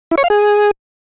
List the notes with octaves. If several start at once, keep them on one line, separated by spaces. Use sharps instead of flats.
E4
C#5
F5
G#4